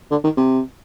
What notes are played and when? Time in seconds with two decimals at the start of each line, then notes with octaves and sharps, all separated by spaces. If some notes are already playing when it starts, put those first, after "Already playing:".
0.11 D3
0.24 D#3
0.37 C3